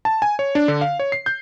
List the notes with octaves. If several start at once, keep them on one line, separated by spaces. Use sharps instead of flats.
A5
G#5
C#5
D4
D3
F5
C#5
C7
G6